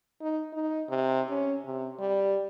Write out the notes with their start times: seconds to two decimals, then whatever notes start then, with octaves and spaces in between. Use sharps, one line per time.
0.22 D#4
0.53 D#4
0.89 C3
1.29 C#4
1.65 C3
1.99 G3